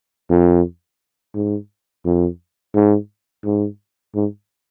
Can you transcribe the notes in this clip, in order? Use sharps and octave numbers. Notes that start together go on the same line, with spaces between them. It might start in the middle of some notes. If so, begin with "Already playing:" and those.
F2
G#2
F2
G#2
G#2
G#2